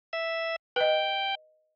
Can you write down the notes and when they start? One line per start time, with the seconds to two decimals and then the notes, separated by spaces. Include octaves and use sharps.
0.13 E5
0.76 B4 D#5 G5